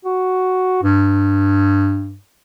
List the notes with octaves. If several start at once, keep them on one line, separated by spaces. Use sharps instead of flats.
F#4
G2